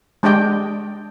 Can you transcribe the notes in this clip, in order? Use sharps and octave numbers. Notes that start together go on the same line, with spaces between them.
G#3 D4 G4 D5 D#5 G5